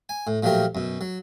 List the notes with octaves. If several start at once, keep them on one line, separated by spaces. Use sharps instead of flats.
G#5
A2
A#2 F3 F#3 A3 G4 A#4
F#2 B2
F#3